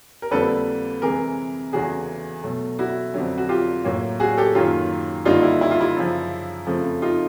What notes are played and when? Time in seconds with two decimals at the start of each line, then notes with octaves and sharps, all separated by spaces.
0.22 A#4
0.31 F2 D3 G3 A#3 A4 B4
1.02 C3 E3 G#3 G#4 A#4
1.73 E2 C#3 E3 A3 F#4 G#4
2.44 B2 F#3 A3
2.79 E4 F#4
3.14 F2 D3 F#3
3.38 F#4
3.49 F4 G4
3.85 A2 F#3 A#3
4.20 F#4 G#4
4.38 G4 A4
4.55 F#2 D#3 F#3 A#3 F4 G4
5.25 G2 D3 G3 A#3 D#4 F4
5.43 E4
5.61 E4
5.71 F4
5.80 E4
5.97 F#2 C#3 F3
6.67 F2 C#3 F3 A3
7.02 D#4 F4